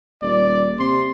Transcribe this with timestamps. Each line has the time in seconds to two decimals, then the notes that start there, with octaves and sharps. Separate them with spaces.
0.22 D#1 D5
0.79 C3 C6